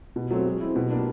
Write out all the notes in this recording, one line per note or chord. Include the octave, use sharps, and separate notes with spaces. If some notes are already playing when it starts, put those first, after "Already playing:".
B2
F#3 A3 C4
G#3
C4 E4
B2
G3 A#3 D4